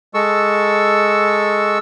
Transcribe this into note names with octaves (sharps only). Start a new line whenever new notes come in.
G#3 A4 C#6 E6